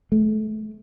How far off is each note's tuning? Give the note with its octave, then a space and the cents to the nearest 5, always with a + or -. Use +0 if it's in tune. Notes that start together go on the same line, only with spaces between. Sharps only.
A3 -35